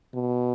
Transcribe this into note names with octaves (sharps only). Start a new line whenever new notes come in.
B2